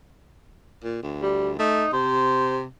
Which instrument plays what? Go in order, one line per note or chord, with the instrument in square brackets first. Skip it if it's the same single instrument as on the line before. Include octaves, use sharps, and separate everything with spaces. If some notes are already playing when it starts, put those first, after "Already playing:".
[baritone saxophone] A#2
D2
[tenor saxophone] G3
[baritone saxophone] A3 [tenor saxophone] D#4
[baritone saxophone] C3 [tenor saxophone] C5